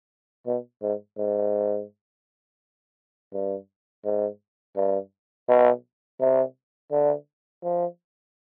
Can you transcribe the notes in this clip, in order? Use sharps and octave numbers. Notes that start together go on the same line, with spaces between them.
B2
G#2
G#2
G2
G#2
G2
B2
C3
D3
F3